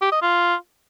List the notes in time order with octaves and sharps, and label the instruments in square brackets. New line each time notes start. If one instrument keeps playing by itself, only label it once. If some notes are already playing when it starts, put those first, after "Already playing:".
[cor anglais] G4
D#5
F4